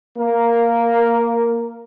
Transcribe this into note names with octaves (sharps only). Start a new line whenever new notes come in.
A#3 A#4